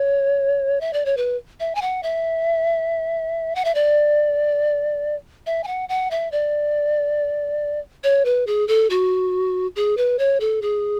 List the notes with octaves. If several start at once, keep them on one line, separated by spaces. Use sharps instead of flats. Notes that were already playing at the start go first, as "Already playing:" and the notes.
Already playing: C#5
E5
D5
C#5
B4
E5
G#5
F#5
E5
F#5
E5
D5
E5
G#5
F#5
F#5
E5
D5
C#5
B4
G#4
A4
F#4
G#4
B4
C#5
A4
G#4